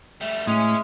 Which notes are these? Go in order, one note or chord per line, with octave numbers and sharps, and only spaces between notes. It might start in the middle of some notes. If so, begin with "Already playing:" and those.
G3 A3 E5
A2 G#3 C#4